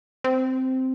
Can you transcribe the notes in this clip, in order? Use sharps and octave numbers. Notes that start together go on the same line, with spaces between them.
C4